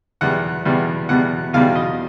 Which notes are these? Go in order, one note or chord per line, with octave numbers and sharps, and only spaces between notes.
E2 B2 G3 F#5
E2 B2 G3
E2 B2 G3 F#5
E2 B2 G3 F5
D#5